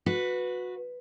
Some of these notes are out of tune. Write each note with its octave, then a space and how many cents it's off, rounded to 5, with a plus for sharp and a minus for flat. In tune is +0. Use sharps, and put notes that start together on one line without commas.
F#4 -20 B4 +0